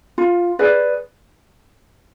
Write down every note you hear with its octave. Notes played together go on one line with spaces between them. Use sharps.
F4
G#4 B4 D5